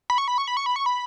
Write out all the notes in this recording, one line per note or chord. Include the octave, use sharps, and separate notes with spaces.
B5
C#6
B5
C#6
B5
C#6
B5
C#6
B5